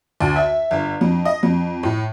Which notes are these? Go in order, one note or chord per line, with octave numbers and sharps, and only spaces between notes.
D2
E5
G1
F2
D#5
F2
A2